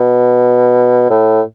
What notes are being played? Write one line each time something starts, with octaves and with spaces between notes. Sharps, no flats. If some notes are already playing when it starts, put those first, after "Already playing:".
Already playing: B2
A2